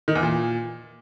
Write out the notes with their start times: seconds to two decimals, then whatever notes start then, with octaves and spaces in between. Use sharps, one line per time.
0.08 D#3
0.15 E2
0.23 A#2